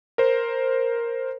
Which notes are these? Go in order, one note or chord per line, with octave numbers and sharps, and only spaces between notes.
A#4 C5